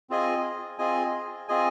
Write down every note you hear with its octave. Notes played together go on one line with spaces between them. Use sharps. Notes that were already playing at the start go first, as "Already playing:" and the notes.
C4 F4 G#4 D#5 G#5
C4 F4 G#4 D#5 G#5
C4 F4 G#4 D#5 G#5